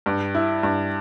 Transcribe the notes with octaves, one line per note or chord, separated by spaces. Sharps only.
G2
E4
G2